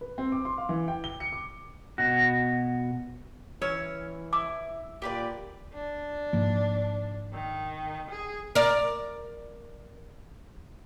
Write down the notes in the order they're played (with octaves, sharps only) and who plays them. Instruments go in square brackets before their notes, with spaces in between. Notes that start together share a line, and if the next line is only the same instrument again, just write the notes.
[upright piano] B4
C4
D6
C6
F5
E3
G5
G7
C#7
D6
[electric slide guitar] B2 F#4
[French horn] E3 [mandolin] C#4 E6 [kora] C#5
[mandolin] E4 [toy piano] D6
[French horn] A#2 [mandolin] G4 B4 D5
[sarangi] D4
[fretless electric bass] G#2 F3 A#3
[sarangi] D#3
G#4
[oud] A#4 D5